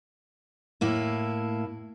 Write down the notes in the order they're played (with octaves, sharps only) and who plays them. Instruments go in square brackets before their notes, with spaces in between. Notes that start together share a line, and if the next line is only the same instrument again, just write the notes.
[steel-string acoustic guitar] A2 A#3 E4